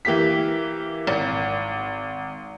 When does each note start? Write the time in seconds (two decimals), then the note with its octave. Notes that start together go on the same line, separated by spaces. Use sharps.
0.05 E3 A#3 G4 B6
1.07 G#1